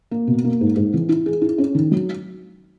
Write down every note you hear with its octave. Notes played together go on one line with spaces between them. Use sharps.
A#3
B2
A#3
G#2
G#2
E3
E4
G#4
E4
C#4
D#3
F#3